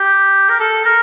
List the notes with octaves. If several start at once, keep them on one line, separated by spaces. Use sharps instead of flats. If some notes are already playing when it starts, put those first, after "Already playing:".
Already playing: G4
A#4
A4
A#4